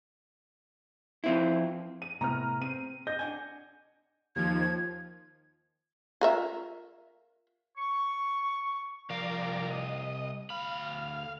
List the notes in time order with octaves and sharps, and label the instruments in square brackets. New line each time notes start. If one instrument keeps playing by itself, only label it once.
[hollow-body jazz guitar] F3 C4 E4
[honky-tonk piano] D#7
[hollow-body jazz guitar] A2 C3 B3 [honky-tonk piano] A#5 F6
[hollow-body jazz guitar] C4 [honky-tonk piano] D#7
[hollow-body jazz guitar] D#5 [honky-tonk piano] G6
[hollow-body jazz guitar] D4 F#5 G#5
[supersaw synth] D#2 F3 [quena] G#6
[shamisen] F4 A#4 E5
[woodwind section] C#6
[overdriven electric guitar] C2 F5 [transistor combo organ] F3 A#4 D5
[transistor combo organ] D#5
[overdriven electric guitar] D2 B5 [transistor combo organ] F5